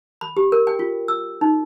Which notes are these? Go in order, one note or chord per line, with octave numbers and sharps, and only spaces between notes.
B5
G4
A#4
G5
F4
E6
D#4